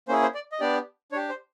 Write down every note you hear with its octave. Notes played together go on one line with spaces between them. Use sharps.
A#3 C#4 E4 G#4 C5
C5
D5
D#5
B3 D4 G4 D5
D4 G4 C#5
C5